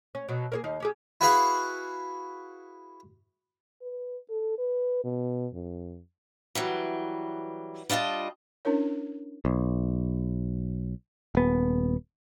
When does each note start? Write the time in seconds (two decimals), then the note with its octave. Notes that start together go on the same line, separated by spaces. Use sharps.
0.15 C#4
0.29 B2 F#3
0.52 A#3 C#4 G#4
0.64 D#2 D#4 F5
0.80 C#4 G4 G#4
1.21 E4 F#4 G#4 B4 F5 F#5
3.82 B4
4.30 A4
4.59 B4
5.04 B2
5.54 F2
6.55 E3 F#3 G3
7.90 G3 D4 F4 D#5 A5
8.65 C#4 D4 E4 A#4 C#5
9.45 B1
11.35 D#1 B3